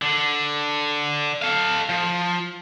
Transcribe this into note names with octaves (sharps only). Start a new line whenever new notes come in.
D3
A4 F5
F3